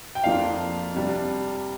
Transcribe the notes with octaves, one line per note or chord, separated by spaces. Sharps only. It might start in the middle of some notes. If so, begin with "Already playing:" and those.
G5
F2 F3 A#3 D4 F5
C3 G3 D4